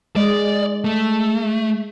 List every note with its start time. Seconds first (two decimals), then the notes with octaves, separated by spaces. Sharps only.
0.16 G#3 D5 D#5
0.85 A3